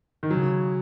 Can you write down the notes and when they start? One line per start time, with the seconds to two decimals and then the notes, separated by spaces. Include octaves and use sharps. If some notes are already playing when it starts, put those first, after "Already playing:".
0.23 D#3
0.31 C#3 F#3